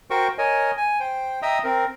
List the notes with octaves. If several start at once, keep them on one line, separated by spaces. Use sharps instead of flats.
F#4 A#4 C5 G5 C#6
A#4 C#5 D#5 G#5
G#5
C5 G5
D#5 E5 G5 A#5 D#6 E6
C4 A#4